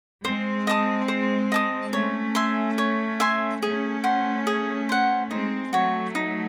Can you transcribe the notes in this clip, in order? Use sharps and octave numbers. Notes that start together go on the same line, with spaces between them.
G#3 C4 C5
D#5 A5 D#6
C5
D#5 A5 D#6
A3 C#4 C#5
E5 G#5 C6
C#5
E5 G#5 C6
A3 C#4 G#4
C5 F#5
G#4
C5 F#5
G#3 C4 D#4
F#3 A3 F#4 C#5
D#4